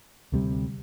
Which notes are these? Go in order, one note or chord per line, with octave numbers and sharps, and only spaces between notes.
D2 C3 G3